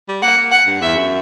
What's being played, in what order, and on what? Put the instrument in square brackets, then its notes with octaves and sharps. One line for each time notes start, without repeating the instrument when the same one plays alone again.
[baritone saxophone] G3
[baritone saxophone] A#3 [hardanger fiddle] F#5
[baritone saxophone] A#3
[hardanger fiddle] F#5
[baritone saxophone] G2
[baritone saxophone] E2 [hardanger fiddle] E5
[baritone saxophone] F#2